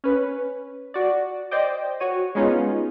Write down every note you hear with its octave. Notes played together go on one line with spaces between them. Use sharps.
C#4 B4
F#4 D5
C5 D5 D#5 G5 D6
F#4 C#5 D#7
G#3 B3 C#4 D#4 F4